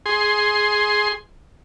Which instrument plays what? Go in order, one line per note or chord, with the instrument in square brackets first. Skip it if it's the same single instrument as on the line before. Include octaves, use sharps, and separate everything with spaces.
[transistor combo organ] G#4 C6